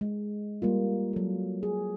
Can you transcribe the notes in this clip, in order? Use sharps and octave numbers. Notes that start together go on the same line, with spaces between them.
G#3
G3 A#3 F4
F#3 A4
G#4